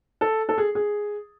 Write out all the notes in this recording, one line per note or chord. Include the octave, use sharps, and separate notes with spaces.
A4
A4
G#4
G#4